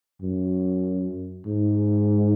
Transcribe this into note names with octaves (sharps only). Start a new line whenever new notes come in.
F#2
G#2